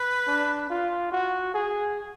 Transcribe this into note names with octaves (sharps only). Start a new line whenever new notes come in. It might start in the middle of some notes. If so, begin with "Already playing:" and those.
Already playing: B4
D4
F4
F#4
G#4